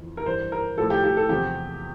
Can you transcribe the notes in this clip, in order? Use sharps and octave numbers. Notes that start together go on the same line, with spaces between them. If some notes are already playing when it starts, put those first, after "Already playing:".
Already playing: F2 E3
A#4
G2 E3 C5
A#4
A2 F3 A4
G4
G4
A4
E2 C3 F3 G4